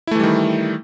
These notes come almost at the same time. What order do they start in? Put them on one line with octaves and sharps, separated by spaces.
E4 A3 E3 G3 D#3